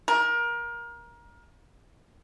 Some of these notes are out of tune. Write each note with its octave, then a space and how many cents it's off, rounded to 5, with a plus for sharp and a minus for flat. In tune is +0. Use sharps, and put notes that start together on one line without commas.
A#4 +25